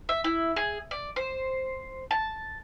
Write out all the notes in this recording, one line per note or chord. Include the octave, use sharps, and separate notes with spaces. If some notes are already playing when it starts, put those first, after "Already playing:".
E5
E4
G#4
D5
C5
A5